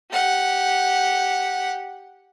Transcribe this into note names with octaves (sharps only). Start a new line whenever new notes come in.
G4 F#5